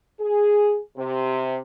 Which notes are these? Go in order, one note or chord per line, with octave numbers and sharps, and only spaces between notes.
G#4
C3